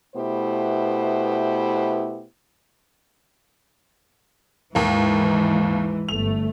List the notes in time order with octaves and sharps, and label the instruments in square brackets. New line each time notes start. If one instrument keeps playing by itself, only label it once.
[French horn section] B2 A3 B3 E4 G4 C5
[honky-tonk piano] D#2 A#3 [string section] G#2 E3
[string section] G1 A3 [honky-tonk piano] F7